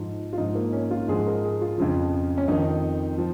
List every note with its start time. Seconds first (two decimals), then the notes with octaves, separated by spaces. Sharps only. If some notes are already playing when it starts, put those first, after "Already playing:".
Already playing: G#2 F3 D#4
0.33 F4
0.38 G#2 F3 D#4
0.55 A#3
0.73 C#4
0.91 F4
1.08 G#2 F3 G#4
1.26 A#4
1.44 G#4
1.61 F4
1.78 F2 C#3 F3
2.38 C#4
2.48 F2 D#3 D#4
3.18 F3